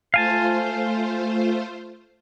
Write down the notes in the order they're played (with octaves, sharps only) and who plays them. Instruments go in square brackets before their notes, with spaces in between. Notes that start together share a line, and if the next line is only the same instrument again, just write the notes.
[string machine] A3 F4 C5 [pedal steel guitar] F5 G#5 A5